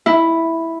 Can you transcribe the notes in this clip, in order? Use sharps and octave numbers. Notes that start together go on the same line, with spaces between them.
E4